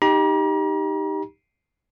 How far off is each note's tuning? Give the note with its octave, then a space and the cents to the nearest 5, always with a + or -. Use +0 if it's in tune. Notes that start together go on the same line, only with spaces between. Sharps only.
D#4 +0 G4 +5 A#5 +40